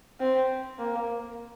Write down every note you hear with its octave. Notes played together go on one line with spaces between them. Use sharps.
C4
A#3